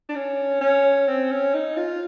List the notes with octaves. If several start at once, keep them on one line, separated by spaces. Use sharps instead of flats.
D4
C#4
C#4
C4
C#4
D#4
F4